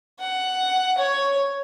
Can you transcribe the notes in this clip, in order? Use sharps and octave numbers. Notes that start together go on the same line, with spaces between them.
F#5
C#5